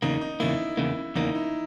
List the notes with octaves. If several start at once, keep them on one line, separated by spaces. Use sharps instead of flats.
E2 C#3 A#3 D#4
D#4
E2 C#3 A#3 E4
E2 C#3 A#3
E2 C#3 A#3 D#4
E4